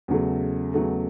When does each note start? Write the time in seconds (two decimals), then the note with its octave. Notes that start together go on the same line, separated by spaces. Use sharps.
0.08 E2 C#3 F#3 A3
0.74 E2 C#3 F#3 A3